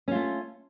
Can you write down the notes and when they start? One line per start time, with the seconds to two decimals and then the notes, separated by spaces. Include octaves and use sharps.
0.08 C#4
0.11 F4
0.15 A3